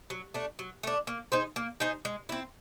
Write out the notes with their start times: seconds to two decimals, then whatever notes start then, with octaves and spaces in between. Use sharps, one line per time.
0.10 F#3
0.34 A3 D4
0.59 F#3
0.83 A3 D4
1.07 A#3
1.32 D#4 G#4 C5
1.56 A#3
1.80 D#4 G#4 C5
2.05 G#3
2.29 C4 E4